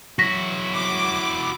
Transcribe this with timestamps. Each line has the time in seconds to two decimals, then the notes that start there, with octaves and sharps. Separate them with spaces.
0.19 F#3 E4 F#4 A#6 B6
0.75 D6